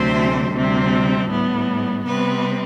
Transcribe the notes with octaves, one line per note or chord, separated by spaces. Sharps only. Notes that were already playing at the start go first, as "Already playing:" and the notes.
Already playing: D2 C3 F#3 A3 C4 C5
D2 C3 G3 C4
A2 G3 B3
C3 G3 B3 C4 B4